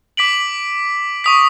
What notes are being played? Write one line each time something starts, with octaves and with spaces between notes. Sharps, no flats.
D6 B6 D7 F#7
C#6 D#6 B6